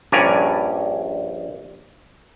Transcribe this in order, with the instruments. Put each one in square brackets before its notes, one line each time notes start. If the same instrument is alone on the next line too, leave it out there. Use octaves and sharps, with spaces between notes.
[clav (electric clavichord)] A#1 G2 C#4 D5 G#5 A#5